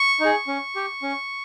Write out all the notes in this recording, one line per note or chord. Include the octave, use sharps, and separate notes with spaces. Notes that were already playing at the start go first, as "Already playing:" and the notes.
Already playing: C#6
D#4 G#4
C#4
G4
C#4